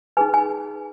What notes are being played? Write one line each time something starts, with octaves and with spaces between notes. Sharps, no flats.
D#4 G#4 B4 G#5
G#5